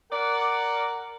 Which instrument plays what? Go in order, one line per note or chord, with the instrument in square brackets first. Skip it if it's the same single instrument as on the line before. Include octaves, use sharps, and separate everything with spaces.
[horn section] A#4 D5 F#5